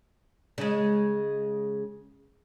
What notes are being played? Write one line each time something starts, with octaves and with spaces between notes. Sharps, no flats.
C#3 G#3